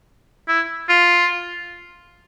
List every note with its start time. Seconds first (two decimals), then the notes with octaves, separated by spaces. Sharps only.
0.48 E4
0.89 F4